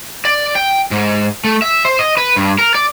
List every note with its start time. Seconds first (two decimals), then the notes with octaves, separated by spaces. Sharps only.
0.25 D5
0.55 G5
0.91 G#2
1.44 A3
1.62 E5
1.85 C5
1.99 D#5
2.17 B4
2.36 G2
2.58 A#4
2.75 D5